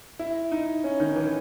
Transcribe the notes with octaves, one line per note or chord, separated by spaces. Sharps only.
E4
D#4
C#4
D#3
E3